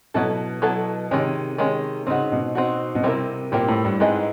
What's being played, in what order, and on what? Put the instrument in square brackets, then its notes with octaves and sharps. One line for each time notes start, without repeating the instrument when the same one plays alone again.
[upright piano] B2 [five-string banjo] F#3 B3 E4 A4
[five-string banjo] F#3 B3 E4 A4
[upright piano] C3 [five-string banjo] D#3 G#3 C#4
[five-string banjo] D#3 G#3 C#4
[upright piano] C#3 [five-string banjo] C4 D#4 F#4
[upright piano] B2
[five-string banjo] C4 D#4 F#4
[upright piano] B2
[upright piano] C3 [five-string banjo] G3 C4 E4 G4 A#4
[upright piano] A#2 [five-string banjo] G3 C4 E4 G4 A#4
[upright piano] A2
G2
[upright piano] G#2 [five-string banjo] C4 E4 G#4 B4 D#5